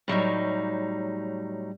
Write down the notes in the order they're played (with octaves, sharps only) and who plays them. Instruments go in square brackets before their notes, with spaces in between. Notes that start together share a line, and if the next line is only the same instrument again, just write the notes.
[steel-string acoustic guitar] A2 F#3 G3 D#4